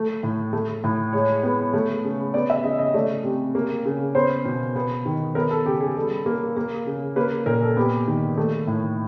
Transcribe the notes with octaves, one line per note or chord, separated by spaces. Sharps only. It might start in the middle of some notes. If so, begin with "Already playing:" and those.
Already playing: A3
A2
A3
A2
G#3 C#5
B3
A3
C#3
B3 D5
E5
C#3 D#5
D#5
A3 D5
C3
A#3
C#3
B3 C5
B2
B3
D#3
B3 A#4
A4
C#3 G4
G#4
G3 A4
A#3
A#3
C#3
A#3 B4
A#2 A#4
A4
B3 G4
D#3
A3
A2